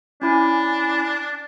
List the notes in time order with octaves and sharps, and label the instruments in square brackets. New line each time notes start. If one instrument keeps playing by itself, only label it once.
[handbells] C#4 E4 G#5 [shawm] D4